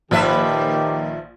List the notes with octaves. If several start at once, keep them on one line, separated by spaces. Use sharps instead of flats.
A#1 D#3 F3 G4 B4 E5